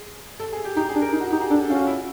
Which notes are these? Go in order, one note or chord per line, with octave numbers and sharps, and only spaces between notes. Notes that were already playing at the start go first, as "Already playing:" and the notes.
Already playing: G#4
A4
G#4
G4
D#4 G4
G#4
D4
A#4
D#4
F#4
D#4 G4
G#4
D4 A4
C#4 F4
F#4
E4